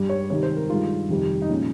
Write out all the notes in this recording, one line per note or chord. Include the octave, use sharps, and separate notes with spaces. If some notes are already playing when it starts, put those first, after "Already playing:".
Already playing: G2 G3
C#5
C3 D#3 G3 C#5
C5
A#4
G2 D#3 G#3 F4
F2 C3 D#3 G3
D#4
A#2 F3 G#3 C#4